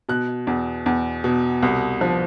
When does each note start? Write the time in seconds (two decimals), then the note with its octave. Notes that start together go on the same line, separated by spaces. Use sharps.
0.09 B2 F#6
0.47 E2
0.86 E2
1.24 B2
1.63 C2
2.01 F3